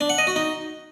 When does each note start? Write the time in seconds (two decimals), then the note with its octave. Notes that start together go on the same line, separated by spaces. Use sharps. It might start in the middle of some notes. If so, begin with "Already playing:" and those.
0.01 D4
0.10 F#5
0.18 D#5
0.27 F#4
0.36 D#4